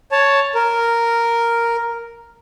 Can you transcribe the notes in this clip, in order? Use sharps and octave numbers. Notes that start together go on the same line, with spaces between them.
C#5 A5
A#4